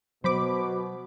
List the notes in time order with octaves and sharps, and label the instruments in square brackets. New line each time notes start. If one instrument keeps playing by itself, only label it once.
[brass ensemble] B2 [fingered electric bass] F#3 [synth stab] C5 B5 D6